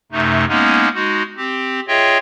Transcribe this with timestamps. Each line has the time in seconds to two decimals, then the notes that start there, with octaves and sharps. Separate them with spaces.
0.12 F#2 C3 A3 D#4
0.48 G#3 A#3 B3 C#4 D#4
0.94 G#3 D#4 F#4
1.37 C4 G4
1.88 F4 G#4 C#5 D#5 E5 G5